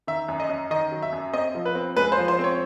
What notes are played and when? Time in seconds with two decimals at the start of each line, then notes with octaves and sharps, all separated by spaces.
0.07 D#3 E5
0.29 F#2
0.40 D#5
0.49 F#2
0.71 D#3 D#5
0.92 F#3
1.02 E5
1.13 F#2
1.33 C4 D#5
1.55 F3
1.65 B4
1.75 C4
1.97 G#3 B4
2.12 C5
2.18 F3
2.28 C5
2.39 C4 C#5